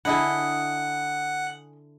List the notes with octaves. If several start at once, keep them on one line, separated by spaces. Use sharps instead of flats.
D3 E4 G#4 D#5 F#5 B5